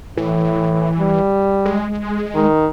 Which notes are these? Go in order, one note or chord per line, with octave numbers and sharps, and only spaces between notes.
A2 E3
G3
G#3
D#3